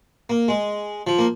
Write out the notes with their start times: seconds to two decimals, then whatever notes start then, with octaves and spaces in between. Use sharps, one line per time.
0.29 A#3
0.48 G#3
1.07 F3
1.18 A#3